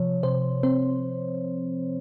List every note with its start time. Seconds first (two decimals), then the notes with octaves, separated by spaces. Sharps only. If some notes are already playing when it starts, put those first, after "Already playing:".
Already playing: C3 F3 C#5
0.23 C3 C5
0.63 C4 C5